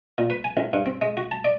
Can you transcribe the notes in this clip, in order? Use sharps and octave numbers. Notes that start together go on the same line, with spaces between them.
A#2
B4
G#5
A1
G2
C4
G#3
F#4
A5
D5